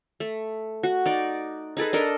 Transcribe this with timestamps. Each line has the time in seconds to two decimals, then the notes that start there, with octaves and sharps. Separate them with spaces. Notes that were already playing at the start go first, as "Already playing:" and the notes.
0.20 A3
0.83 F#4
1.06 D#4 D5
1.77 D#4 G#4 A4 B4
1.93 D4 A4 A#4 D#5